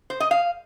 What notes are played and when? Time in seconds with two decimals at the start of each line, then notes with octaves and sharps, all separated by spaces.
0.10 C5
0.20 D#5
0.31 F5